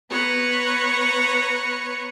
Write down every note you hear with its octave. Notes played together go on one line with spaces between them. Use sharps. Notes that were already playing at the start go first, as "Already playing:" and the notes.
B3 B4 C#5 A#5